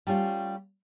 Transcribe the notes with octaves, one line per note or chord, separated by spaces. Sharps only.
G3 A3 C#4 F4